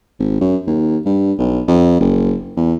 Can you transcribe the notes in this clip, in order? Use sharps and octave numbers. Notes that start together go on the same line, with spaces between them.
G#1
F#2
D#2
G2
B1
F2
F#1
E2